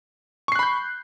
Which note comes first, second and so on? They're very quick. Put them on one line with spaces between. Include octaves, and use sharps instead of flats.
C#6 C7 F#6 B5 G6